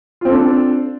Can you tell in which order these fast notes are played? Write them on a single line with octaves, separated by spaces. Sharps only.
F4 C4 A4 D4